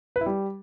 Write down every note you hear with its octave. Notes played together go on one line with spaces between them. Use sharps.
B4
E4
G3